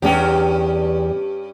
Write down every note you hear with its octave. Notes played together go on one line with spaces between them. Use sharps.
E2 G2 C#4 G4 D#5 G5